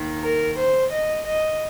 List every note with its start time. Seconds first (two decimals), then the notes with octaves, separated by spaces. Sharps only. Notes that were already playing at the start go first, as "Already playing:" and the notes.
Already playing: D#2 D#3
0.22 A#4
0.56 C5
0.90 D#5
1.24 D#5